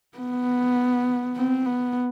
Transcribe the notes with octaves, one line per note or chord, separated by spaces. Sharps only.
B3
C4
B3